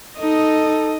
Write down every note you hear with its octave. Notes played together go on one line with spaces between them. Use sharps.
D#4 A4 D#5